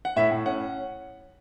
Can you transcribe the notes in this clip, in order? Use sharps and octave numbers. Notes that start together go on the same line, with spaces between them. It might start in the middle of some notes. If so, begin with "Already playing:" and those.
F#5
A2 E5
A2
C#4 F#5